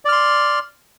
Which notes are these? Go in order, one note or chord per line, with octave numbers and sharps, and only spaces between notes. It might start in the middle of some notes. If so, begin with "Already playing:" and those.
D5 C6 F6